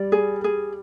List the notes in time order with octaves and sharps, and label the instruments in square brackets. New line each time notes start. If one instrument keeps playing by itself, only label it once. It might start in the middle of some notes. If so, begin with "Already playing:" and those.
Already playing: [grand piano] G3 [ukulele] D5
[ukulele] G#4
G#4